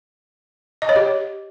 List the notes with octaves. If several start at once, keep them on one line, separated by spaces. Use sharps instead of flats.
D#5
C#5
G4